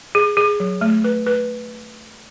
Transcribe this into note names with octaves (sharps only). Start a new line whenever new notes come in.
G#4
G#4
F#3
A3
B4
B4